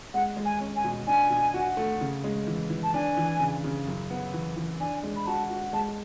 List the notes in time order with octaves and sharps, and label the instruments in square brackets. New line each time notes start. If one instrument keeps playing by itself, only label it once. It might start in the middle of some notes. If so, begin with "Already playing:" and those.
[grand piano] G#3 [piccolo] F#5
[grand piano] G#3
[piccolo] G#5
[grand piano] C#4
[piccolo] G#5
[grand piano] B2
[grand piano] D4 [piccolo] G#5
[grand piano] B2
F#4
A3
C#3
G#3
E3
E3
[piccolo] A5
[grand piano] D4 [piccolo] G#5
[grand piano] E3
C#3
C#3
F#2
B3
E3
E3
[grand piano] D4 [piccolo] G#5
[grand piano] G#3
[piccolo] B5
[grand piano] F#4 [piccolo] A5
[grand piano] F#4
[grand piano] G#3 [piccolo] A5